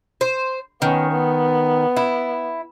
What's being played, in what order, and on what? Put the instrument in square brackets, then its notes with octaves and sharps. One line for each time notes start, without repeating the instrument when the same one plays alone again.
[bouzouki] C5
[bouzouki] D#3 [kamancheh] B3 C#4
[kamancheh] B3
[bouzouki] E4